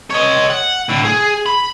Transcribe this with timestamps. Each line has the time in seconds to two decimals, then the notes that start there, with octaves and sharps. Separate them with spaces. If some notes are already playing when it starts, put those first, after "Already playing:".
0.10 C#5 D#5
0.51 F#5
0.89 A2 D3
1.05 G#4
1.46 B5